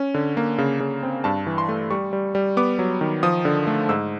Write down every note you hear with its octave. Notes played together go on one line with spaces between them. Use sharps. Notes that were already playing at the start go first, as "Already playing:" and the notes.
Already playing: C#4
D3
A#3
C#3
C#3
C4
G2 A5
E3
C6
A3
G3 C#6
G3
G3
B3 D6
F#3
D#3
F3 D#6
D3
A3
G#2 E6